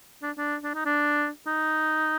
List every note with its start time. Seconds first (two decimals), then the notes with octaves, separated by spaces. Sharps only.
0.22 D4
0.38 D4
0.64 D4
0.75 D#4
0.86 D4
1.47 D#4